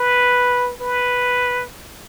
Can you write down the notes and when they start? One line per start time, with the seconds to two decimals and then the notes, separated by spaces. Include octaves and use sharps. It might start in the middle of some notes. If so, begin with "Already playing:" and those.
Already playing: B4
0.81 B4